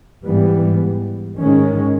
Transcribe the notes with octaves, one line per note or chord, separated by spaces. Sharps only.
G#2 E3 G3 B3
G#2 D#3 G#3 C#4